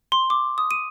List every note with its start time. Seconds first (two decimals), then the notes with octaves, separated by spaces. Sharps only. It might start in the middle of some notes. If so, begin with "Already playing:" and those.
0.12 C6
0.30 D6
0.58 D#6
0.71 D#7